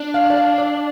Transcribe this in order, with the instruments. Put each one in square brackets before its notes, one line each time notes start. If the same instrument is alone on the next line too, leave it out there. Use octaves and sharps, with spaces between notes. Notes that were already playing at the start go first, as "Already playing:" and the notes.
Already playing: [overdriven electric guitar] D4
[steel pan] F5
D5
F5
D5